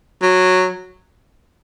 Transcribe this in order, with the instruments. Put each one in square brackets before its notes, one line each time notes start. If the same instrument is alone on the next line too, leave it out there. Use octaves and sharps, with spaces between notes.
[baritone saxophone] F#3